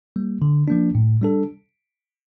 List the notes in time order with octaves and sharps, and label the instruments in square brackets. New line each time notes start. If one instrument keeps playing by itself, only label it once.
[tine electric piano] G3 A#3
D3
F3 A#3 D4
A2
G3 D4 A4